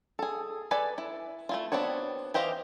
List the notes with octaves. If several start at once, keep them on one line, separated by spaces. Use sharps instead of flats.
G#4 A4
A4 B4 D5 G#5
E4
A3 E4 F4
B3 C4 D4 F#4 C#5
E3 G4 C5 D#5 F5